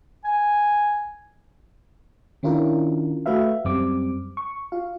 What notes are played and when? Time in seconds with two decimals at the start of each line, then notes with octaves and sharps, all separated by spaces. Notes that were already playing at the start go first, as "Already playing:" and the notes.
0.25 G#5
2.43 D#3 C#4 D4 E4 F4 A#4
3.26 A3 F#4 B4 E5 F5
3.65 F#2 G3 C4 D6
4.37 C#6
4.72 F4 F5